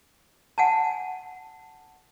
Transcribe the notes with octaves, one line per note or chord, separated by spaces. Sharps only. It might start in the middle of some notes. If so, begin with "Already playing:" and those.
F#5 G#5 A5